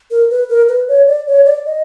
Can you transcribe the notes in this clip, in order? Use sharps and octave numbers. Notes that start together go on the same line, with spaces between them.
A#4
B4
A#4
B4
C#5
D5
C#5
D5
D#5